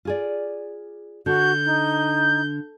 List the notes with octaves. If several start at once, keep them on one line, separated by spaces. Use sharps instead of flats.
F4 G#4 D5
D3 F#4 G6
D#4